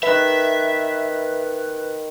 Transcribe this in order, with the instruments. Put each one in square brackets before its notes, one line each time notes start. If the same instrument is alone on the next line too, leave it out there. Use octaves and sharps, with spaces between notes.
[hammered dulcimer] D#3 B5 [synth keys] B4 F#6 [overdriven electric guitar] E5